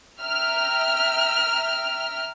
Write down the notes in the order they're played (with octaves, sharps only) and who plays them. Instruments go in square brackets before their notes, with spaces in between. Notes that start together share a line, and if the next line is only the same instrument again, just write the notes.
[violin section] E5 G5 A#5 F6